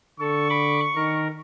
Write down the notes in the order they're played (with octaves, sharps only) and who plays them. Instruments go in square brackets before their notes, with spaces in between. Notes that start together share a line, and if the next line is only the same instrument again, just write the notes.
[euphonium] D3 [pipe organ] A4 [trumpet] C#6
[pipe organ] B5 D6
[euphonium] D#3 [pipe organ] A#4